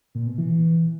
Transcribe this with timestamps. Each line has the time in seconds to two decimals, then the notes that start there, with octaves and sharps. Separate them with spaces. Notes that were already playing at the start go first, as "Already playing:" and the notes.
0.15 A#2
0.27 B2
0.38 E3
0.50 E3